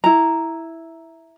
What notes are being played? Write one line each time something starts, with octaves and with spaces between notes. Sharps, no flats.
E4 A#5